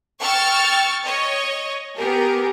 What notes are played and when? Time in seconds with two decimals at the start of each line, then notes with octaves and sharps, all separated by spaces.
0.21 G5 C#6 E6 F6 A6
1.06 C#5 D#5
1.98 B3 G4 G#4 A#4